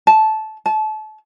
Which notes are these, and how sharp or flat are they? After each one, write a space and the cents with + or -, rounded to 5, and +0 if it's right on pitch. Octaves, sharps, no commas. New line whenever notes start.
A5 -15
A5 -30